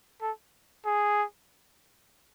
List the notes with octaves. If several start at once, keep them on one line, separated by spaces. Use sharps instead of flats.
A4
G#4